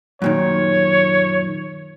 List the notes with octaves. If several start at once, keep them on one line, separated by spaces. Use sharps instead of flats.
F#2 A#2 D#3 C#5